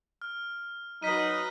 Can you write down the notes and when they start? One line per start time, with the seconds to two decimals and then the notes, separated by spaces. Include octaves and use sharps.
0.22 F6
1.03 F#3 D#4 B4 D#5 F6 B6 D#7